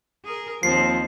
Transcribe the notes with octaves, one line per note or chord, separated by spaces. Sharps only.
G#4 A#4
D#2 F3 C4 C7